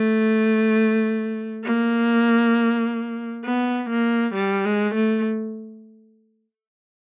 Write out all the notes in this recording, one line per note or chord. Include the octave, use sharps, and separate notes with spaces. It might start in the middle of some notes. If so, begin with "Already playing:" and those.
Already playing: A3
A#3
B3
A#3
G3
G#3
A3